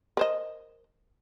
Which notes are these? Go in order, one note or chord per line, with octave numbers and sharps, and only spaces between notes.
A#4 C5 D#5